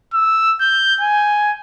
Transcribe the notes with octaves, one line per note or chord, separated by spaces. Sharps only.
E6
G6
G#5